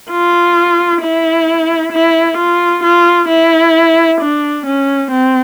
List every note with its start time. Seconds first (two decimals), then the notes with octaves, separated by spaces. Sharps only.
0.11 F4
1.02 E4
1.92 E4
2.38 F4
2.84 F4
3.29 E4
4.21 D4
4.66 C#4
5.11 C4